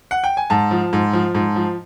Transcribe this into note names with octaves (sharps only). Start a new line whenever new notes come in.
F#5
G5
G#5
G#2 A5
F3
G#2
F3
G#2
F3